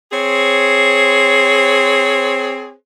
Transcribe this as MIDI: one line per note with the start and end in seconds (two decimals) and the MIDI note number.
0.12 2.73 60
0.12 2.73 68
0.12 2.73 72
0.12 2.73 73